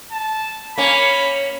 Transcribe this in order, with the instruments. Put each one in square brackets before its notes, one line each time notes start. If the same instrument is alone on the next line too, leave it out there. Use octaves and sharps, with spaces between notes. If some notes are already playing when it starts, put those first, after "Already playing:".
[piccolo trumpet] A5
[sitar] A#3 C#4 [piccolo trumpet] B5